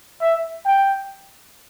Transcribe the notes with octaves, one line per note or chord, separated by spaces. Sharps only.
E5
G5